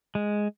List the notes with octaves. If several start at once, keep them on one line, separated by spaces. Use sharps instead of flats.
G#3